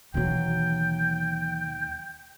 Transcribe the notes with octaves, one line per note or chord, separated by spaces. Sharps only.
D#2 B2 E3 F#3 G5